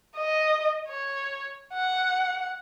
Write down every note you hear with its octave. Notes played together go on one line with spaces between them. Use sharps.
D#5
C#5
F#5